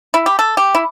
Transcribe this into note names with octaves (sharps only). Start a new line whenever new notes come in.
E4
G4
A4
G4
E4